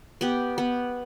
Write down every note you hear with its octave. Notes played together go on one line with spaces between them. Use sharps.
B3 G4
B3